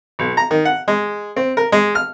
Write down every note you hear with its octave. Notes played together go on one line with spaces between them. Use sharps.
B1
A#5
D#3
F#5
G#3
C4
A#4
G#3
F6